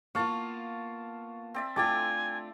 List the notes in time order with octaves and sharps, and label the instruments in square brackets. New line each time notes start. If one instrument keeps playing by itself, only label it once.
[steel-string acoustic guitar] A#3 B3 F4 [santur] F5 A5 [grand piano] C#6
[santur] C4 D5 E5
[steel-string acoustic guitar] A3 D4 F4 [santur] A4 [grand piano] G5 D6 A6 [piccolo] G#5